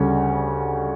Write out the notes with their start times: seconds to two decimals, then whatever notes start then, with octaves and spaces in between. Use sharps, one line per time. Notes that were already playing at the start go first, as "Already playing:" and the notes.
Already playing: D2 C#3 G3 C#4